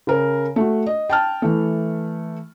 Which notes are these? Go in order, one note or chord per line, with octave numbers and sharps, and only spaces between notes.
C#3 A#4
A3 F#4
D#5
G5 A5 F6
E3 A3